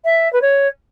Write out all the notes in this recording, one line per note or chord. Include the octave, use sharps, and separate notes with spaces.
E5
B4
C#5